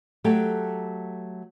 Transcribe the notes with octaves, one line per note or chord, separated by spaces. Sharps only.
F#3 A3 G4 A4